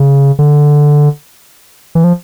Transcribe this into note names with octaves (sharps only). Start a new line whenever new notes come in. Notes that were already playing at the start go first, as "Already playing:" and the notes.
Already playing: C#3
D3
E3
F3